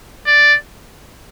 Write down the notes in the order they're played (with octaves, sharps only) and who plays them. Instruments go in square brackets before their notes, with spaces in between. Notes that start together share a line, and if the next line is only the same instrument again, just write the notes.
[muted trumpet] D5